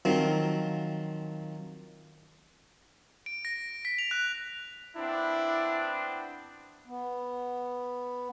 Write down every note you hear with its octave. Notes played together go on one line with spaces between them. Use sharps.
D#3 F3 F#3 C4
D7
A#6
B6
F7
F#6
B3 C4 D4 E4
B3